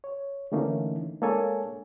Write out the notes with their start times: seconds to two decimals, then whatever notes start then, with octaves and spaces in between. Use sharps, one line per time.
0.04 C#5
0.52 D3 E3 A3 A#3 C#4 D#4
1.22 G#3 A#3 D4 A4 C#5 G#5